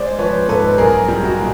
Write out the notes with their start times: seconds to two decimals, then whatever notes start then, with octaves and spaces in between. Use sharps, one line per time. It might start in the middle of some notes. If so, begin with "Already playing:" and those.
Already playing: G#3 C5 D5
0.19 F3 B4 C#5
0.48 G#2 A4 B4
0.78 B1 G#4 A#4
1.08 G3
1.23 F#4
1.38 A#2